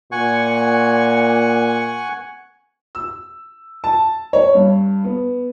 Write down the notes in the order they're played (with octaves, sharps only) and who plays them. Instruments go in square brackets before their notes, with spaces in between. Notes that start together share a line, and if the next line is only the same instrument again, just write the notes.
[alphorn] A#2 [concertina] F#5 G#5 C#6
[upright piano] E6
A5
C#5
G2
B3